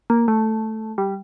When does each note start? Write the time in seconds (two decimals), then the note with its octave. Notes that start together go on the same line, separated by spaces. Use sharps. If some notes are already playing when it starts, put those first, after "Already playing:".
0.10 A#3
0.28 A3
0.98 G3